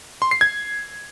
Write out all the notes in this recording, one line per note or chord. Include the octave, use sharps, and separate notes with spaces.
C6
C7
G#6